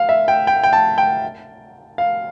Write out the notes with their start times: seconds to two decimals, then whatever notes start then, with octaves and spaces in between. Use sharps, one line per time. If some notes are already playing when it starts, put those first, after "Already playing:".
Already playing: F5
0.09 E5
0.28 G5
0.47 G5
0.63 G5
0.73 A5
0.98 G5
1.98 F5